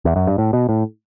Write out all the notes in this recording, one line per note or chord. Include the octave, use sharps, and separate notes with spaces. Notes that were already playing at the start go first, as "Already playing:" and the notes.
E2
F#2
G2
A2
B2
A2